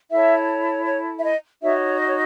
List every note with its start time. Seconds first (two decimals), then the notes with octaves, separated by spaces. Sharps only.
0.10 E4 A4 C#5 E5
0.86 C#5
1.19 E5
1.24 D#5
1.61 D#4 F#4 C#5 E5
2.00 D#5
2.07 C#5